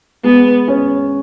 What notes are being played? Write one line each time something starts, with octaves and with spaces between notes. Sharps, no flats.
G#3 B3
C#4